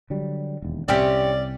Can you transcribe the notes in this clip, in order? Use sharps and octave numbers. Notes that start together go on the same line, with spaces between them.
D3 F#3 G3
E1 D#2
C2 C3 C4 C#4 G4 D5